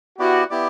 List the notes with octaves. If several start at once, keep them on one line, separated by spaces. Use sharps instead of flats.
B3 E4 F#4 G4 D5
B3 E4 G4 D5